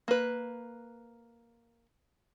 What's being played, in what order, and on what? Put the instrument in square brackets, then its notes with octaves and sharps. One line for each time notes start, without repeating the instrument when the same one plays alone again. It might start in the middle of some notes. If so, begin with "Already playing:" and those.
[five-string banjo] A#3 B4